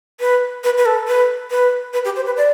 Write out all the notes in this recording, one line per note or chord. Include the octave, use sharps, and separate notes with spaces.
B4
B4
B4
A4
B4
B4
B4
G4
C5
B4
D5